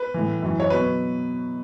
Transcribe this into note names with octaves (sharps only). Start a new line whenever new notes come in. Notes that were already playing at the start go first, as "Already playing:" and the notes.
Already playing: B4
A2 E3
F#2 E3
C#5
B2 F#3 B4